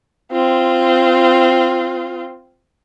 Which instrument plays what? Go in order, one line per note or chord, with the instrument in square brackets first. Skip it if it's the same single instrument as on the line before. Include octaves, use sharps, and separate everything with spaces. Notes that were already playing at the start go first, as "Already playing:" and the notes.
[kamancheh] C4 F4